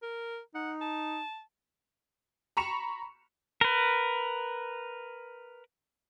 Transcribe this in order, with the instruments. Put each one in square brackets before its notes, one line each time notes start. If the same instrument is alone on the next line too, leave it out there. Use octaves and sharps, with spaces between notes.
[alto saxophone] A#4
[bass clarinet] D#4 [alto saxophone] F#5
[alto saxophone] A5
[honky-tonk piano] A#5 B5 C#6 C#7 E7 F7
[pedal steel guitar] A#4 B4